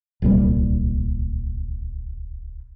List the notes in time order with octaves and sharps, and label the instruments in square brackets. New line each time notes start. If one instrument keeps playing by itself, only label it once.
[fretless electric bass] D1 C2 A#2 G3